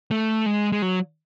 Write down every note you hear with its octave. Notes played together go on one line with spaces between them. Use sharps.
A3
G#3
G#3
F#3